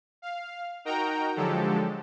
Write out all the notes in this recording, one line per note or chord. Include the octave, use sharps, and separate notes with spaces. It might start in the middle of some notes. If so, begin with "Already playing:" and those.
F5
D#4 F#4 A#4 G5 A#5
D3 F3 F#3 G#3 G4 A4